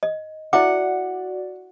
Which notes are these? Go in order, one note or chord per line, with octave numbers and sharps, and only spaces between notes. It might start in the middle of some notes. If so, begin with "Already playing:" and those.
D#5
E4 F#4 D5 E5 F#5 D6